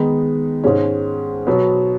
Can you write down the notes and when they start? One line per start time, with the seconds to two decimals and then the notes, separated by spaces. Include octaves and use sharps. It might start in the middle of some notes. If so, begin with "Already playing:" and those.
Already playing: D#3 G#3 B3 D#4
0.64 G#2 G#3 C#4
1.47 B2 F#3 B3